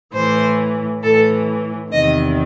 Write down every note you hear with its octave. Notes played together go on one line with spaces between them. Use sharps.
A2 E3 C5
A2 E3 A4
E2 C3 D#3 D#5